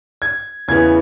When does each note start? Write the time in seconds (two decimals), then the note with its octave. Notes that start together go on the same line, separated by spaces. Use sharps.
0.22 G#6
0.68 E2 C#3 E3 B3 G#6